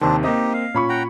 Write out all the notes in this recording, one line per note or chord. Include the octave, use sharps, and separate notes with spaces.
D#2 C3 D#3 C4 D4
A#3 C4 D#4 G4 D#5
F5
A#2 C#4 B5 C#6
F#5 G5 A#5